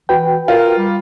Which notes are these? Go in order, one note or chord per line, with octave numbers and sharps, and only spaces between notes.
E3 F#4 B4 G5
F4 A#4
G3